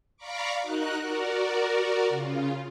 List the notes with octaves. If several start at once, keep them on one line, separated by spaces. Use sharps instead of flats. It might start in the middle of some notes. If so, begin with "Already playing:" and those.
D5 F5 A#5 B5 C#6 D6
D#4 F#4 A#4 F#6
F#4 A#4 D5
C#3 F4